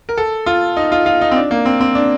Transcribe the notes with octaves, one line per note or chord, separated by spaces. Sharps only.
A#4
A4
F4
D#4
F4
F4
D#4
C4
D4
A#3
C4
C4
D4